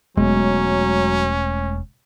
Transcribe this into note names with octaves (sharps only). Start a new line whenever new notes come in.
E1 F#3 G#3 A3 C#4